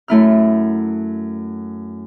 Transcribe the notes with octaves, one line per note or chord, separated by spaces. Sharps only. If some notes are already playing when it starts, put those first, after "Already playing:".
F#2 A3 E4 F6